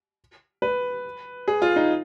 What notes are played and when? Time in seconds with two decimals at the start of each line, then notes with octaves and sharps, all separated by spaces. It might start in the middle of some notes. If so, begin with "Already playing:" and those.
0.62 B4
1.48 G#4
1.62 F4
1.76 D#4